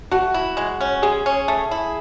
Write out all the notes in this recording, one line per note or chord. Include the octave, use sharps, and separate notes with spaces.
A3 F#4
E4
G#3
C#4
G#3 G#4
C#4
A3
E4